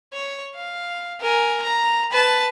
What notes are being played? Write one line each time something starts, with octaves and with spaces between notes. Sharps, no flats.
C#5
F5
A#4 G#5
A#5
B4 A5